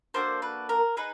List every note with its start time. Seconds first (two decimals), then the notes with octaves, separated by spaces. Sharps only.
0.14 A#3 D4 F#4 A4 C5
0.42 B4
0.69 A#4
0.97 D#4 G#4 B4